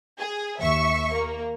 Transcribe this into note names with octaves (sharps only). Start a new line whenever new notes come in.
G#4
D#2 E5 C#6
A#3